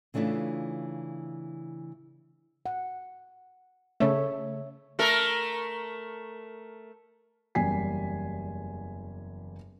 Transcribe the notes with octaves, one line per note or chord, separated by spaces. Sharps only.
C#3 E3 A3 D4 F4
F#5
C#3 A3 C#5 E5
A3 A4 A#4
F#1 E2 G3 G#5 B6 C7